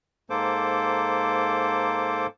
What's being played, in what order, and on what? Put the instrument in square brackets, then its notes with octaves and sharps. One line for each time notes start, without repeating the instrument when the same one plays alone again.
[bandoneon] G#2 A#3 A4 C5 D6